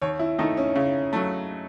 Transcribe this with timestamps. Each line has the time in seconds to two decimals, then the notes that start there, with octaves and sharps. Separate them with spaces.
0.02 D#2 C#5
0.19 E4
0.38 D#3 A3 D#4
0.57 C#4
0.75 C#3
1.13 F#3 A3